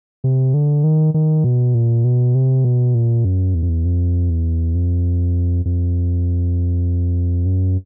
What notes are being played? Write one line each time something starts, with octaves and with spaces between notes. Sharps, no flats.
C3
D3
D#3
D#3
B2
A#2
B2
C3
B2
A#2
F#2
E2
F2
E2
F2
E2
F2
F2
F#2